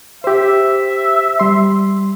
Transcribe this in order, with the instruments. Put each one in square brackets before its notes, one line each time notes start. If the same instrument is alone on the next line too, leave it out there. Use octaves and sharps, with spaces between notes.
[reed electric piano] G4 C5 [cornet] E5
[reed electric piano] G3 C6